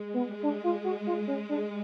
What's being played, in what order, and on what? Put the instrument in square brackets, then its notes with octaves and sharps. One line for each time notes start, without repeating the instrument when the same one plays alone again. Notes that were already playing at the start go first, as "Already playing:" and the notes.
Already playing: [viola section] G#3
[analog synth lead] B3
D4
F4
F#4
F4
C#4
D4